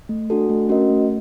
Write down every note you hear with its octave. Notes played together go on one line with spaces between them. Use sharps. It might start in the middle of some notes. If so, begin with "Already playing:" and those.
A3
D4 F#4 A4
A3
C#4 F#4 A#4 D#5
A3